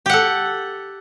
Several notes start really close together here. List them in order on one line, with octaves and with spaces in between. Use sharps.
G4 F#5 A4